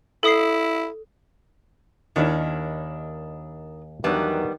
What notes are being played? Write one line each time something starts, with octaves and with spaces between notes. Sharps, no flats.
E4 A4 D#6 C7
D#2 D#3 C#4 D4 E4 C#5
E2 D#3 F#3 G3 B3 D4